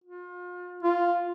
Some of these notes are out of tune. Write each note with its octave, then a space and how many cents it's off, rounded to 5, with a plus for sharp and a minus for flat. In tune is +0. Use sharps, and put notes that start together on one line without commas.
F4 +35
F4 +0